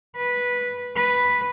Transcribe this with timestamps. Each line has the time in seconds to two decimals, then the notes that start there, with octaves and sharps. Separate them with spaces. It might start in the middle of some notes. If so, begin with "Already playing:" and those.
0.16 B4
0.96 B4